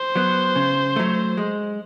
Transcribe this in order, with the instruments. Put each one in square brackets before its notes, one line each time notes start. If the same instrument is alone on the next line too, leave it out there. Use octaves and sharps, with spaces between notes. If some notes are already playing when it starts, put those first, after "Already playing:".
Already playing: [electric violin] C5
[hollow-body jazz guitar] F#3 B3
C#3
F#3 A3
G#3